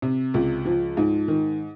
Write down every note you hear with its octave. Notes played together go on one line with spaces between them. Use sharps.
C3
C#2
F3
G#2
D#3